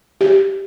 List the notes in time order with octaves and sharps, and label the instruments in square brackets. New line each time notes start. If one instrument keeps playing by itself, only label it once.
[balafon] G4